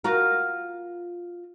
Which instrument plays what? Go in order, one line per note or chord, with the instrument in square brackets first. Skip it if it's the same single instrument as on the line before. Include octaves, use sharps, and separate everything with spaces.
[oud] F4 F#4 A#4